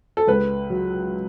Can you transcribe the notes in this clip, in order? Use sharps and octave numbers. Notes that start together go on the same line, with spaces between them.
A4
C#2 B4
F#3